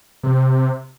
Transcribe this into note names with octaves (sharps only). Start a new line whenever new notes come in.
C3